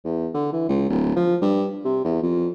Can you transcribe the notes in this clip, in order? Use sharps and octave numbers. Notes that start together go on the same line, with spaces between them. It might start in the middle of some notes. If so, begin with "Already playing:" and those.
E2
D3
E3
C#2
D1
F3
G2
C3
E2
F2